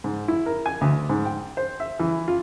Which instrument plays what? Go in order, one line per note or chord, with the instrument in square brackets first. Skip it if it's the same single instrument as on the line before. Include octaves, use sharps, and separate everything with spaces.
[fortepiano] G#2
E4
A#4
G#5
D2
G#2
G5
C5
E5
E3
F4